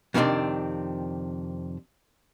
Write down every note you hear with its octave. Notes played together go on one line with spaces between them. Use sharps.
F2 C3 D#3 A3 C4 D4